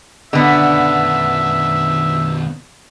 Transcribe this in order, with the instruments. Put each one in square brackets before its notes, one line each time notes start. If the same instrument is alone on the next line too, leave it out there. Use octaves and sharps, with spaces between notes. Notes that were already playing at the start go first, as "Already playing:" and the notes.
[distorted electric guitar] B2 D#3 [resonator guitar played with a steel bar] D3 B3 [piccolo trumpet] E5